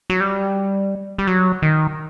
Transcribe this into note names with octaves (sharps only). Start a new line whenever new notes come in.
F#3
G3
G3
F#3
D#3